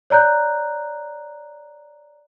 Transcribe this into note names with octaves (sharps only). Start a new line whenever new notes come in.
C#5 D5 A#5 F#6 G6